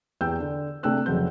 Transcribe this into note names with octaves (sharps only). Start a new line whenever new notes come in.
E2 G4 G5 E6 G6
D3
C3 A3 D4 G5 E6 F#6
F1 C#3 F#3 C4 G6